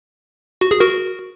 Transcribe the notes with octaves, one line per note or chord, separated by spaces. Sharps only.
F#4
G#4
F#4 A#4